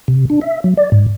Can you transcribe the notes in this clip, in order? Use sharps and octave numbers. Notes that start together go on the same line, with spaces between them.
C3
D4
E5
F#3
D5
G#2